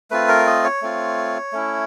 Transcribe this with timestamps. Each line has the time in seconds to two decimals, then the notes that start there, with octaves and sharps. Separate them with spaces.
0.11 A3 C4 F4 B4
0.28 A#4
0.46 D#5
0.64 C#5
0.82 A3 C4 F4
1.52 A3 C#4 E4